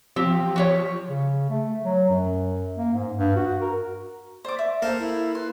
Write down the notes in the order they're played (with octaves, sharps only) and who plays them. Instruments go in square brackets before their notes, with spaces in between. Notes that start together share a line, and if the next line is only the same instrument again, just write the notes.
[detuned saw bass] F3 [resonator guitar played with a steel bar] C4 G4
[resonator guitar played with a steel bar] F#4 G4 C#5
[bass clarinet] C#3
A3
F#3
F#2
A#3
G#2
G2
F#4
A#4
[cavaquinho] C5 D6 [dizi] D5
[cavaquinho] E5
[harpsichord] A#3 A4 F5 [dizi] C5
[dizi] E4
[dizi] B4 [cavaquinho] C6